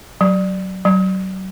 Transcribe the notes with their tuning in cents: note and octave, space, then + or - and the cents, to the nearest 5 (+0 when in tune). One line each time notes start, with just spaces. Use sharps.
F#3 +15
F#3 +30